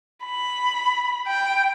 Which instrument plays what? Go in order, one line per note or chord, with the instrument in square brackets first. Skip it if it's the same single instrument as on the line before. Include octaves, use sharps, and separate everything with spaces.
[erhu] B5
G5